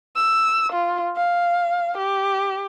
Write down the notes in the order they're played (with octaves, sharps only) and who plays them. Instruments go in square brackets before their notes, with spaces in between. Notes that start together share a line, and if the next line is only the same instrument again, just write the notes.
[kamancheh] E6
F4
F5
G4